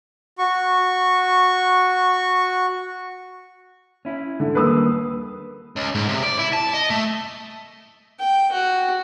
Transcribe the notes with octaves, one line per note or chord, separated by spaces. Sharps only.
F#4 C#6
C#4 E4
D3
D#2 G3 A#3 B4 D#6 E6
C#2
G#2
C3
D5
E4
A5
D#5
A3
G5
F#4